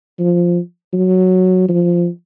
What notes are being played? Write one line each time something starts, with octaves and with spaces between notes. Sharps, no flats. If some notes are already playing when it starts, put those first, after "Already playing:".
F3
F#3
F3